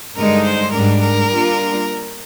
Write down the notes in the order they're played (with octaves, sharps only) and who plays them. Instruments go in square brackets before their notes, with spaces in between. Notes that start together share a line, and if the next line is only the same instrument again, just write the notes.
[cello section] G2 D3 G#3 D#4 [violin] A#4
[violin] C5
[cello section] G#2 G3 D4 [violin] A#4
[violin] A#4
[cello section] G3 A#3 D4 F4